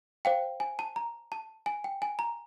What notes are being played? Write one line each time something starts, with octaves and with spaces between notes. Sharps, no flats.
C5 F5 G5
G#5
A5
A#5
A5
G#5
G5
G#5
A#5